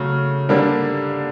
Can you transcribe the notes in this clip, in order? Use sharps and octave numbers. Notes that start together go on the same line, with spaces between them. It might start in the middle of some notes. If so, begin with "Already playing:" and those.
Already playing: C#3 F#3 A3
D3 G3 A#3 D4